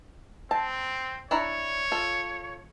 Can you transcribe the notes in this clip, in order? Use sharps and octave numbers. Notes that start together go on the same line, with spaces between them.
C4 A5
D4 E4 C#5 A#5
F4 A4